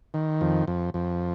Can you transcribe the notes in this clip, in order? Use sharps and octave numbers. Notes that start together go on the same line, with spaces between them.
D#3
F2
F2
F2